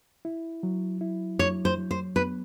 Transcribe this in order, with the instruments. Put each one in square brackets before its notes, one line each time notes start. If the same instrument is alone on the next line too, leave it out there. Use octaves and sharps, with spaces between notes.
[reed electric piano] E4
F#3
E4
[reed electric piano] F#3 [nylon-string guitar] C#5
[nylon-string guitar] C5
[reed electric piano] F#3
[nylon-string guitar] C5
[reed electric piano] B3 [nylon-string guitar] B4